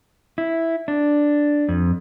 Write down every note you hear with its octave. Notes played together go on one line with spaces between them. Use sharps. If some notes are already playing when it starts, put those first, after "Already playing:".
E4
D4
F2